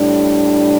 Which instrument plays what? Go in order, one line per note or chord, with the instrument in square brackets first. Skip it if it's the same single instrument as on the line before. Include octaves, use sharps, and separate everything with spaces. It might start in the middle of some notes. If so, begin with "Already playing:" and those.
Already playing: [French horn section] A2 G3 D4